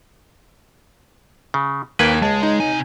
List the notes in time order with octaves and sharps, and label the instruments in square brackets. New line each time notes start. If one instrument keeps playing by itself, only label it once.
[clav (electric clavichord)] C#3
[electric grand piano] D#2 A#3 G#6 [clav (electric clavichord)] B4 G5
[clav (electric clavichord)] C#2 [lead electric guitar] G#3 [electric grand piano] A5
[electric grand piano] D#4
[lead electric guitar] C3 G#5